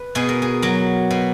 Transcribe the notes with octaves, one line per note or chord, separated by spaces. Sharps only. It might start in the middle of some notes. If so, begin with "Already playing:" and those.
Already playing: B4
B2 G#4
A#4
G#4
F#3 A#4
B2